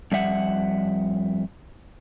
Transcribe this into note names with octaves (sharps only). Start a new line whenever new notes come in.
F2 G3 E5 F#5